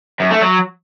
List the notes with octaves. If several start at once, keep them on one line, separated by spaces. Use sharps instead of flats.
F#2
A3
F#3